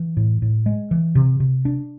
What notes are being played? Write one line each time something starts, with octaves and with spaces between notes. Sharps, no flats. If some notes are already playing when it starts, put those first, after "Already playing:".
Already playing: E3
A2
A2
G#3
E3
C3
C3
D4